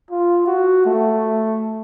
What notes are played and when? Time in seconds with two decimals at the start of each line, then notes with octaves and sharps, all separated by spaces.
0.11 F4
0.48 F#4
0.86 A3